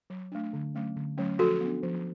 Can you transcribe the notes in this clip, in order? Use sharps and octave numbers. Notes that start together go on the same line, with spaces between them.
F#3
A3 D4
D3
F#3 A3 C#4
D3
F#3 A3 C#4
F3 F#4 A4
B3 D4
F3